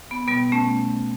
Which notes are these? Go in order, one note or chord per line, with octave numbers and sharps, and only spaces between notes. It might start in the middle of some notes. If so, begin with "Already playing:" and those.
B3
B2 G3 B3
A3 C#4